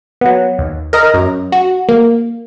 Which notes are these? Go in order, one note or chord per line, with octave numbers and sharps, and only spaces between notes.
F#3 B3
D#2
A#4 D#5 A#5
F#2
F#4
A#3